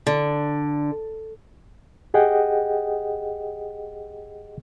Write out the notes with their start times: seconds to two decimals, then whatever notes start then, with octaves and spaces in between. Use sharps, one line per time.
0.07 D3
2.14 G4 G#4 D#5 F#5 G5